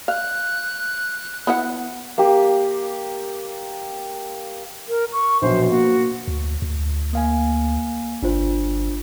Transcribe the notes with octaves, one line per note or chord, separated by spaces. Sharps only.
F5 F#6
B3 E4 F#5
A#3 G4
A#4
C#6
A#1 B2 F#3 C5
A#3 F#4
D2
D2
A#3 F5 G#5
G1 D4 F4 C5